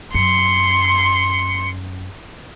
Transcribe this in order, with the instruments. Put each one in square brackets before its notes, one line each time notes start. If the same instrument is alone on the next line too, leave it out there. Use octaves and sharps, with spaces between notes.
[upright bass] F#2 [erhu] C6 [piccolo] C#7